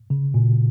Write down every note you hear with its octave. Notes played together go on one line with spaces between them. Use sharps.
C#3
A#2